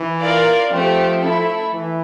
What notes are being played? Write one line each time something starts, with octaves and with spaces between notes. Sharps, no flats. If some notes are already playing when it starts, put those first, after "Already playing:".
Already playing: E3
F4 A#4 D5 F5
F3 A3 C4 G4
A3 E4 A4 E5
E3